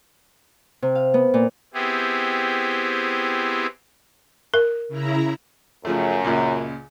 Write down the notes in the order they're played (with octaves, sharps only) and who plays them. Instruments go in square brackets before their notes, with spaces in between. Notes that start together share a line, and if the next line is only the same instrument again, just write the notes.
[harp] C3
F5
B3
A#2
[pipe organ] B3 C4 E4 G4 G#4
[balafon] A#4
[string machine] C#3 E4 A#5
[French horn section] F#2 [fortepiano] C#3 F3 A3
[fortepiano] C#2 A#2